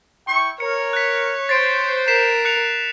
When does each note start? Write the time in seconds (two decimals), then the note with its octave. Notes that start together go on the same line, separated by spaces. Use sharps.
0.26 E4 G5 C#6
0.60 A#4 C#5 C#7
0.93 F#6 B6
1.49 C5 A6 C7 D7
2.08 A#4 B6 C7 E7
2.45 F#6 C#7 F7